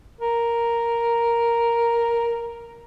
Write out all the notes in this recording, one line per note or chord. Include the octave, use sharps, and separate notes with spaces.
A#4